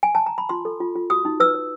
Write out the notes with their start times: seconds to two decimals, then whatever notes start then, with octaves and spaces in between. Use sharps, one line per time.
0.03 G#5
0.15 A5
0.26 A#5
0.38 B5
0.49 F4 C6
0.65 A4
0.80 F4
0.95 F4
1.10 F#4 D#6
1.25 D#4
1.40 B4 E6
1.55 B4